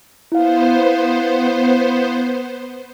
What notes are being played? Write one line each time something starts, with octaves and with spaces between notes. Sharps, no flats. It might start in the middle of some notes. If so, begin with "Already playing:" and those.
B3 E4 C5 F5